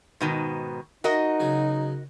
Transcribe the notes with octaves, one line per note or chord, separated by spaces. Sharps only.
G#2 B2 D#3
D#4 F#4 A#4 D#5
C#3 F#3